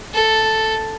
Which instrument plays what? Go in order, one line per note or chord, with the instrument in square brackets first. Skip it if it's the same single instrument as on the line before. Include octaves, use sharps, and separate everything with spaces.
[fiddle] A4